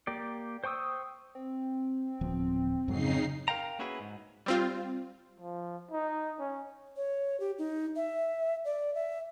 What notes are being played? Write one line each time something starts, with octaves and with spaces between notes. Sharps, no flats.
A#3 G4 D5
C5 G5 C#6 D#6 E6
C4
D1 F3 B3
F2 G#2 C#3 F#3 D#4 C7
A#4 F5 G5 A#5
A#3 C#4 E4 F#4 G#4 B4
G#2
G3 C4 F4
F3
D#4
C#4
C#5
G4
D#4
E5
D5
E5